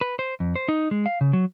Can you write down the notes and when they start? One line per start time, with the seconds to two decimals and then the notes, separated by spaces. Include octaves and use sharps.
0.01 B4
0.19 C5
0.40 F2
0.56 C5
0.68 D#4
0.91 G#3
1.06 F5
1.21 C#3
1.33 F#3